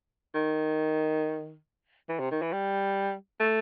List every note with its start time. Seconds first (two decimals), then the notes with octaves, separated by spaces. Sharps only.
0.35 D#3
2.09 E3
2.20 C3
2.31 D#3
2.42 E3
2.52 G3
3.39 A3